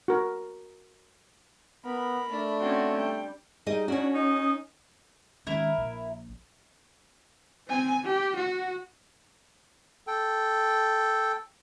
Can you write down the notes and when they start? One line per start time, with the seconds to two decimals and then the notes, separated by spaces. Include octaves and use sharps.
0.08 F#4 A#4
1.85 B3 A#4 B5
2.31 A3 D4
2.60 C4 C#4 F#4
2.97 G3 G5
3.66 G3 D#4 G#4 D#5
3.88 C#4 D4 F#4 C#5
4.14 D#4 D#6
5.47 D#3 G#3 C#4 E4 A#4
5.78 A#1
7.67 C4 G#5
8.04 G4
8.36 F#4
10.07 A4 G5